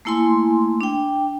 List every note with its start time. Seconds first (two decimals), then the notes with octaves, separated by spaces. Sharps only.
0.05 A3 A#3 E4 G#5 C6
0.81 D4 G5